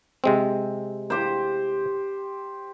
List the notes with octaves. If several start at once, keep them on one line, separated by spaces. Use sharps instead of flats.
C3 G#3 C4
G4 C5